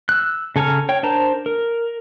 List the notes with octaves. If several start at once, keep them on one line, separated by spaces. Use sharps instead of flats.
E6 F#6
C#3 A4 G#5 A#5 F6
C#5 G5
D4 A#4 C5 A5 A#5
A#4